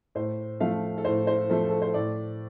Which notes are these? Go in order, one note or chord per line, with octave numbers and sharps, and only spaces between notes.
A2 C5
F3 A3 F5
A4
A2 C5
C5
F3 A3 A4
A4
C5
A2 D5